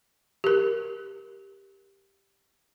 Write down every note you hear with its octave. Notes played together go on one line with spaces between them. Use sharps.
G4 A#4